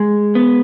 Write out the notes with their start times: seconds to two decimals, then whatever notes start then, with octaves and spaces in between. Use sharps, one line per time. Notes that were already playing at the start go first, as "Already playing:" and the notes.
Already playing: G#3
0.35 B3